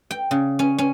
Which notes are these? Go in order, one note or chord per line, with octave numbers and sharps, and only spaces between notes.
G5
C#3
C#4
C#4